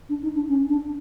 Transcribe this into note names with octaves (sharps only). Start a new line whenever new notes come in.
D4
D#4
D4
C#4
D4